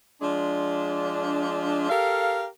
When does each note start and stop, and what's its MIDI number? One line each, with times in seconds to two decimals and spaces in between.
0.22 1.88 53
0.22 1.88 56
0.22 1.88 62
1.90 2.45 67
1.90 2.45 69
1.90 2.45 70
1.90 2.45 77